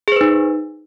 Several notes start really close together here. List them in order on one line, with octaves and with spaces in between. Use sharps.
G#4 C5 B4 D#4